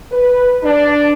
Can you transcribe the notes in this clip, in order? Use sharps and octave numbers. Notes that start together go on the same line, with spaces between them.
B4
D4